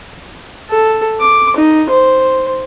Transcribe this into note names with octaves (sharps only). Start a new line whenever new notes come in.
A4
D6
D#4
C5